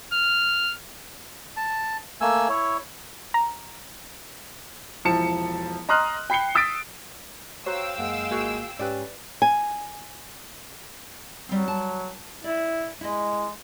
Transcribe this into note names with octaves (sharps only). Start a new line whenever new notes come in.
F6
A5
A3 A#3 G#5 E6
E4 C#5
A#5
E1 F3 E4 A5 C#7 E7
D#5 A#5 C6 D#6 F6 F#6
G5 B5 C7 C#7 G7
D#6 E6 A6 B6 D7
F#4 C5 C#5 F5 G5 A#5 E6
F#2 G#3 A#3 F#5
G#1 A#3 F4 F#4 G#4
G#2 C#4 G4 B4 D5
G#5
F#3 G3 C4
A5
E4 D5
G#3 E4 D#5